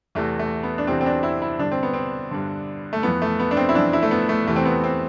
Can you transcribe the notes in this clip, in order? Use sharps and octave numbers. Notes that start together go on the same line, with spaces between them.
E2 C3 E3 A3
A3
B3
D4
E2 C3 E3 C4
C4
D4
E4
E4
G2 D3 D4
C4
B3
C4
G2 D3
A3
F2 E3 B3
A3
B3
D4
C4
E4
F2 E3 D4
E4
A3
B3
A3
E2 C3 E3 A3
C4
B3
C4